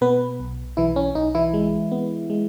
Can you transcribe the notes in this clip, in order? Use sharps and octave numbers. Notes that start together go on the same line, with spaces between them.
B2 B3 B4
B1
B1 E3 E4
C#4
B1 D#4
E3 E4
G#3
B3
G#3